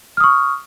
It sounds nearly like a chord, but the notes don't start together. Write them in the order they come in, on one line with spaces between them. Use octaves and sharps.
F6 D#6 C#6